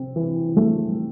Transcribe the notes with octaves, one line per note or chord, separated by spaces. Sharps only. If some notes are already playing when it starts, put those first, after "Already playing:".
Already playing: C3 C4
E3
A3